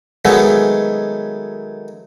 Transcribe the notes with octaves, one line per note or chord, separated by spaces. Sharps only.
D#3 F#3 G#3 A3 B3